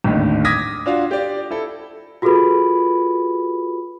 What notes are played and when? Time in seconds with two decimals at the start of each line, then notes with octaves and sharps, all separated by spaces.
0.04 G#1 D#2 A2 D3
0.45 D6 D#6 G#6 A#6 B6
0.86 D4 F4 F#4 F5
1.11 G4 D5
1.51 E4 A4
2.22 F4 F#4 G#4 A4 B4 B5